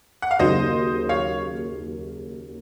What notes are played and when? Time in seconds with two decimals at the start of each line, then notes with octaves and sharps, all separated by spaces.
0.22 F#5
0.31 F5
0.39 D#2 C#3 F#3 A#3 D#4 C5 D#5
1.09 C#5 F5